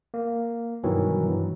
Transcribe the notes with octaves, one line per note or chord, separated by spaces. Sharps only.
A#3
G2 B2 D#3 E3 F#3
G2